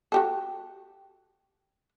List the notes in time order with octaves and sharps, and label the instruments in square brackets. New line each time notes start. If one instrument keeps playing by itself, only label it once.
[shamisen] F#4 G4 A4